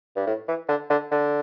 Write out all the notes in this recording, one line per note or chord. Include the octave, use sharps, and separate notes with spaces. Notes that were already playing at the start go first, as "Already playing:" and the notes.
G2
A2
E3
D3
D3
D3